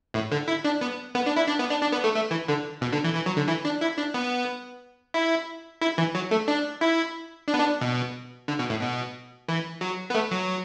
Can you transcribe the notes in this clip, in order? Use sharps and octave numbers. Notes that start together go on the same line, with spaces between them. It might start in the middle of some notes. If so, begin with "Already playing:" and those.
A2
D3
E4
D4
B3
B3
D4
E4
D4
B3
D4
D4
B3
A3
A3
E3
D3
B2
D3
E3
E3
F#3
D3
E3
D4
E4
D4
B3
E4
E4
E3
F#3
A3
D4
E4
D4
B3
D4
B2
D3
B2
A2
B2
E3
F#3
B3
A3
F#3